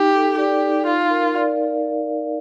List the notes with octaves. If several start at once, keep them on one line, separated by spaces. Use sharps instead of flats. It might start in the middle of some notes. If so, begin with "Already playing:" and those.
Already playing: D#4 G4
A4
G4 D5
D#4
F4 F5
A#4
D5